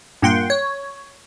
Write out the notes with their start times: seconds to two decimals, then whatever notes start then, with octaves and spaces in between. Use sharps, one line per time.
0.22 G2 A#2 A#3 F#5 G5 C6
0.50 C#5